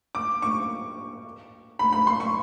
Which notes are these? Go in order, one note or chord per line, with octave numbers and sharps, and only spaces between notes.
D6
C#6
B5
B5
C6
C#6